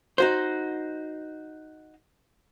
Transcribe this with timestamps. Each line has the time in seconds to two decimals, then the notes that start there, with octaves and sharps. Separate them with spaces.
0.18 D#4 F#4 C5